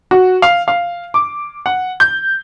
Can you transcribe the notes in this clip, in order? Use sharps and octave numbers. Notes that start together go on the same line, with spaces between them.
F#4
F5
F5
D6
F#5
G6